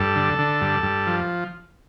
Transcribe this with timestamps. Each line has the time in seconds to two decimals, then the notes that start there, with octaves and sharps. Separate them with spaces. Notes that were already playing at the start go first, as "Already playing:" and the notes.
Already playing: G2 A4
0.16 D3
0.38 D3
0.61 G2
0.83 G2
1.07 F3